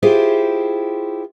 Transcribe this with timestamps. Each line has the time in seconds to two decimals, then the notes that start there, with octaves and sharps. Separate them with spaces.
0.02 E4 F4 G4 G#4 C5